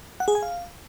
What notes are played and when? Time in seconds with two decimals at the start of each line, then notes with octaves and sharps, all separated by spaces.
0.20 F#5
0.28 G#4
0.35 G#5
0.43 F5